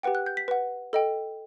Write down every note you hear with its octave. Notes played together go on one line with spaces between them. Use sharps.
G4 B4 F#5 G5
F#6
G6
B6
B4 F#5
A4 D#5 G5